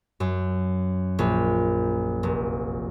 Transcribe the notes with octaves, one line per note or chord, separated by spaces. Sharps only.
F#2
A#1
F1